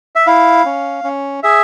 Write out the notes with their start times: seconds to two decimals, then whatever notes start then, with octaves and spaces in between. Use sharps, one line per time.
0.15 E5
0.27 E4 F5
0.65 C#4
1.04 C#4
1.43 G#4 E5